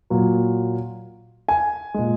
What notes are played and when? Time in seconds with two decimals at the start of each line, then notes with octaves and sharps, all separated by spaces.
0.10 A#2 F#3
1.48 G#5
1.94 A#2 G#3